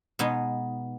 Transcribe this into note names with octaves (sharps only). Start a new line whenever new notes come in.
B2 G#3 B3 D#4